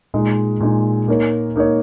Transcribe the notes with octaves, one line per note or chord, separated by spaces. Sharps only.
A#2 G#3 D#4
A#2 G#3 D#4
A#3 D#4 A#4 C#5
A#3 D#4 A#4 C#5